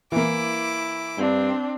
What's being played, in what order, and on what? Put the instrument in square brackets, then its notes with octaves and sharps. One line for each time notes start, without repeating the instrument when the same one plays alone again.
[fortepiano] E3 A#3 [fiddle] E4 D6
[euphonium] G2 [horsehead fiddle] C4 D4